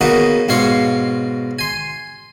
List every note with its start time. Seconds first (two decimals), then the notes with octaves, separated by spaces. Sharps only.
0.01 C#3 A#3 B3 D#4 F#4
0.49 G#2 B2 C#5 F5 C6 C#6
1.59 G#5 C6